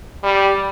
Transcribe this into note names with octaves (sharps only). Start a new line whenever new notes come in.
G3